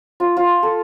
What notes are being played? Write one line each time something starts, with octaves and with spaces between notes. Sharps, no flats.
F4
F4
A4